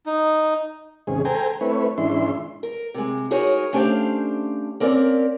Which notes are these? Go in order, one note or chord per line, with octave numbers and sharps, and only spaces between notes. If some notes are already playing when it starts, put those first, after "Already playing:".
D#4
D#2 G#2 C3 C#4 G#4
A4 C5 G5 G#5 A#5
A3 C4 E4 B4 C#5
G#2 E3 C#4 D4 E4 C6
A#4
C3 G#3
D#4 F#4 G#4 A#4 C#5
A3 C#4 D4 G4 C5 F5
A#3 C4 C#4 A#4 D5